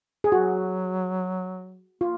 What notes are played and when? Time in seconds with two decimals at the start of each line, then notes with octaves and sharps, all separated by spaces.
0.24 G#4
0.32 F#3 F#4
2.01 A#3 F4